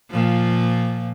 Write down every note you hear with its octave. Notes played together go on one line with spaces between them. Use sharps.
A#2 F3